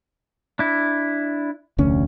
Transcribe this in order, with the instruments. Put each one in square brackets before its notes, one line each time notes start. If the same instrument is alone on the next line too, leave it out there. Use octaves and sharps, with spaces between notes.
[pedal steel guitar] D4 E4
[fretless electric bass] F1 D2 C#4